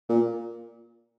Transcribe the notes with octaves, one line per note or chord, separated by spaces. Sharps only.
A#2